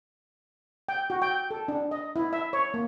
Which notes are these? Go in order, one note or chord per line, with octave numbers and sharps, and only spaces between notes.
G5
F#4
G5
A4
D4
D#5
E4
E5
C#5
A#3